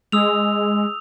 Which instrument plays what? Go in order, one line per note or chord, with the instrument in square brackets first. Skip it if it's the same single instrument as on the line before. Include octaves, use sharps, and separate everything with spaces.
[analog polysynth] G#3 [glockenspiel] D#6 E6 F7